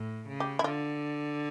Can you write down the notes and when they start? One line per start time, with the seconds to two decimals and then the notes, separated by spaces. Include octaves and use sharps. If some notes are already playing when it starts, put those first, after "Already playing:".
Already playing: A2
0.28 C#3
0.40 G4
0.59 E4
0.64 D3 F4